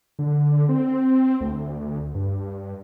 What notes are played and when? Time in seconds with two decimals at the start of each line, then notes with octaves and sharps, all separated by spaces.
0.19 D3
0.69 C4
1.41 D2
2.14 G2